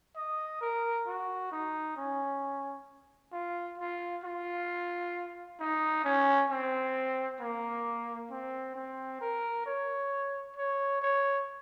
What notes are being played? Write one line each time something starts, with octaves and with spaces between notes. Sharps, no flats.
D#5
A#4
F#4
D#4
C#4
F4
F4
F4
D#4
C#4
C4
A#3
C4
C4
A#4
C#5
C#5
C#5